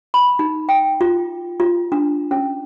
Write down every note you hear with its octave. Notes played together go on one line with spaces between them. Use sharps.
B5
D#4
G5
F4
F4
D4
C#4